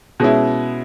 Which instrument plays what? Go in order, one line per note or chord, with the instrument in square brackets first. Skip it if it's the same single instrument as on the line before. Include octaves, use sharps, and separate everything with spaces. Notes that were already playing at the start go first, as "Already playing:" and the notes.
[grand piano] B2 G#3 C#4 E4